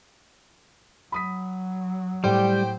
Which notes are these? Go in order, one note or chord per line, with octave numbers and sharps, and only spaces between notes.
F#3 B5 D#6 B6
A2 G3 G4 C5 G5